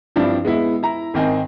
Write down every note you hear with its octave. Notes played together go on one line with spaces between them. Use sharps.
G2 F3 C4 D4 E4
G#3 B3 E4
E4 A#5
G#1 D#3 C4 D#4 G#5